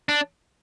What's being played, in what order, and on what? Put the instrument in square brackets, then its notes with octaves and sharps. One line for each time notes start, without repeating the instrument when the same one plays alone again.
[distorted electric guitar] D4